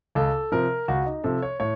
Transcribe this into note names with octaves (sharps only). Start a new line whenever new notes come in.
C#2 A4
C3 F3 A#4
C#2 F#4
D#4
C3 F3 A4
C#5
A2 C#5